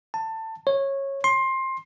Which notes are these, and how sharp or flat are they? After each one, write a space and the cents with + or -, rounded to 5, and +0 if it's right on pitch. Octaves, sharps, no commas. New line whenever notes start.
A5 +20
C#5 -15
C6 +20